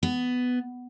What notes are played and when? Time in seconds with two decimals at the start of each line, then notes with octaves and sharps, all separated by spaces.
0.03 B3